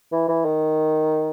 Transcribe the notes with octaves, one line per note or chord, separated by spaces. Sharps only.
E3
E3
D#3